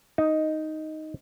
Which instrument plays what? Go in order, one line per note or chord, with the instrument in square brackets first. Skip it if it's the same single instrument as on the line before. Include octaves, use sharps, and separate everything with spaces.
[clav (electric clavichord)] D#4